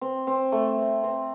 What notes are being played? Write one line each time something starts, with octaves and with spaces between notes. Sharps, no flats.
C4
C4
A3
C4
C4